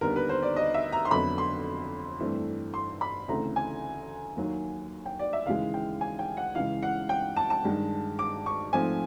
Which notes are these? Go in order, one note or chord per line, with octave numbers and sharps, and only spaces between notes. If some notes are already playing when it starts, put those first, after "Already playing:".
D#2 D3 G3 B3 A#4
B4
C5
D5
D#5
E5
A#5
C6
F2 D3 F#3 B3 B5
C6
G2 E3 A3 C4
C6
B5
D2 C#3 E3 A3 C4 A#5
G#5
D#2 D#3 F#3 A#3
G5
D5
E5
D#2 C#3 E3 G#3 F5
G5
G#5
G5
F#5
C#2 C#3 E3 F5
F#5
G5
A5
A5
G2 D#3 G#3
D6
C#6
G#2 F3 A3 C4 G#5